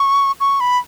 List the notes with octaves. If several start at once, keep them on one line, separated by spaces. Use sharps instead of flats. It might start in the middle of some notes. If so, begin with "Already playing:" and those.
Already playing: C#6
C#6
B5